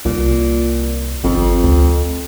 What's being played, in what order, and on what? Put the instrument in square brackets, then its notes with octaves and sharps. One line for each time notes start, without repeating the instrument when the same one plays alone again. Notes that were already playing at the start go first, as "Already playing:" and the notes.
[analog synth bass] C2 [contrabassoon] A#2
[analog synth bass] G#1 [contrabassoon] F2
[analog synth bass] D2